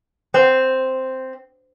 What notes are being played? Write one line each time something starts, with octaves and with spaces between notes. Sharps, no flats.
C4